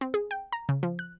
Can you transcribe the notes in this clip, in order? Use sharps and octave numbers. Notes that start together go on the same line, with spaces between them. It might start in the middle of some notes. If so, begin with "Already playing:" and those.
C4
G#4
G5
A#5
C#3
F3
F#6